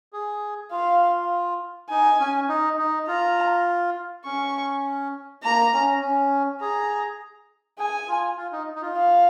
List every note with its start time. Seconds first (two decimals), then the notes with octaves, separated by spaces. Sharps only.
0.13 G#4
0.72 F4 F5
1.90 D#4 G#5
2.20 C#4
2.49 D#4
2.78 D#4
3.08 F4 A#5
4.25 C#4 C#6
5.43 A#3 A#5
5.73 C#4
6.01 C#4
6.61 G#4 A#5
7.79 G#4 G#5
8.08 F4
8.37 F4
8.52 D#4
8.75 D#4
8.82 F4
8.97 F5